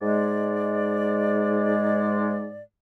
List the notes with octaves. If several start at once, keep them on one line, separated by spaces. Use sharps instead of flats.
G#2 G#3 D5